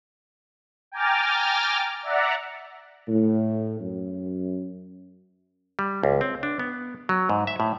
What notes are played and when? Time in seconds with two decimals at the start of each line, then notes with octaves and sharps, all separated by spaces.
0.92 G5 G#5 A#5 D6 F6 A6
2.03 D5 E5 F#5 A#5
3.08 A2
3.80 F#2
5.79 G3
6.03 C#2
6.21 C4
6.43 D4
6.59 B3
7.09 F#3
7.29 G#2
7.47 E5
7.60 A2